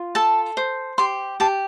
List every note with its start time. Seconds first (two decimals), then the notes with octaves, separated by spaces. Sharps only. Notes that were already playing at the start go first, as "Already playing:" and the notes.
Already playing: F4
0.15 A4 A5
0.57 C5
0.98 G4 C6
1.40 G4 A5